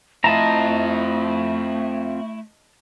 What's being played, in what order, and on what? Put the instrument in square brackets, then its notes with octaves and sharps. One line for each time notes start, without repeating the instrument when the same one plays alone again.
[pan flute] A3 [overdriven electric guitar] C4 F4 [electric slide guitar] E4 [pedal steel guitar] D#5 A5 A#5